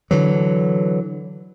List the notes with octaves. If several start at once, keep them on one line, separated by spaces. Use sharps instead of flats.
D3 E3 F#3